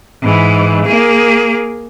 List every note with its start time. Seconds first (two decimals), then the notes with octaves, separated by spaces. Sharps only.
0.22 G#2 E3
0.86 A#3 G#4